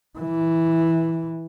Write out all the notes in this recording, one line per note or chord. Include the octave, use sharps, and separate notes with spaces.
E3